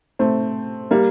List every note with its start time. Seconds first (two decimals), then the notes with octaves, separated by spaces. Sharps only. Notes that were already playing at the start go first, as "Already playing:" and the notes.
0.19 A3 C4
0.91 G3 A#3